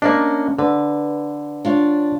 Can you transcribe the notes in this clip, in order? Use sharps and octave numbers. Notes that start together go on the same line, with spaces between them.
A#3 C#4 D4 D5 D#5
D3 B4
D4 F4 C#5